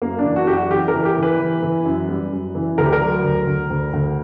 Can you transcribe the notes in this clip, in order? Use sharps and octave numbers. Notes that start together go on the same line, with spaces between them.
F#2 A#3
D4
E3
F#4
F#2 G4
F#4
E3 G4
A#4
E3
G4
E3
B4
E3
E3
F#2
G3
F#2
E3
D2 A#4
G4
A#4
F#3
D2
D2
D2
D2